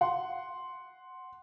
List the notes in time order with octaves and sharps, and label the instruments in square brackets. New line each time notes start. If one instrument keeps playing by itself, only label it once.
[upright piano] F#5 C6